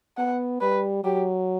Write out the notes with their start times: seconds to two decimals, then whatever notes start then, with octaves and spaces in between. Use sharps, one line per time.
0.18 B3 F#5
0.61 G3 B4
1.04 F#3 G4